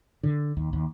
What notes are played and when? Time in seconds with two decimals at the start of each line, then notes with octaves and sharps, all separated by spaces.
0.23 D3
0.57 D#2
0.73 D#2